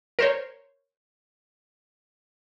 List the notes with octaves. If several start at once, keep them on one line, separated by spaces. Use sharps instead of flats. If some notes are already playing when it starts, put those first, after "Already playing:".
A#4 C5 C#5